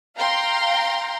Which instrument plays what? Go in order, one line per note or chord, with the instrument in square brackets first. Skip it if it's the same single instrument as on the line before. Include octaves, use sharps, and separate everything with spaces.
[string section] F5 G5 A#5 C6